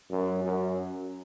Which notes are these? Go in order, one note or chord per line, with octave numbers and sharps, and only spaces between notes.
F#2
F#2